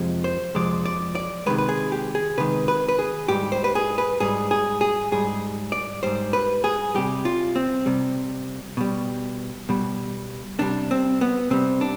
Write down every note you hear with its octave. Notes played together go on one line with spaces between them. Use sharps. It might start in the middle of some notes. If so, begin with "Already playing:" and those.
Already playing: F2 C3 F3 G#3
C5
F2 C3 F3 G#3 D5
D5
D5
C3 D#3 G#3 B4
B4
G#4
G4
G#4
C3 D#3 G#3 B4
B4
B4
G#4
G#2 G3 G4
C5
B4
G#4
B4
G#2 G3 G#4
G#4
G#4
G#2 G3 G#4
D5
G#2 G3 C5
B4
G#4
C3 G3 G4
F4
C4
C3 G3
B2 G3
B2 G3
C3 G3 D4
C4
B3
C3 G3 C4
D4